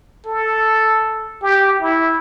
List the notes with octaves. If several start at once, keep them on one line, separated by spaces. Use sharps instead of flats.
A4
G4
E4